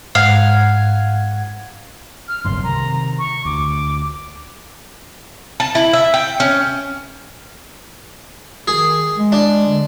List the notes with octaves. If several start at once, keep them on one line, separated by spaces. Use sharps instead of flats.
G#2 F5 F#5 G#6
F6
F#1 C2 G2 C6
C3 D#3 A#5
C#6
D2 D6
A5
E4
E5
G5
C#4
D#3 G#4
G#3
D4
D3